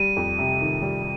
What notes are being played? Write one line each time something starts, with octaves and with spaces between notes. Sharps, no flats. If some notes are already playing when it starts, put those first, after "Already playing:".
Already playing: G3 D#7
F2
C3
D#3
G3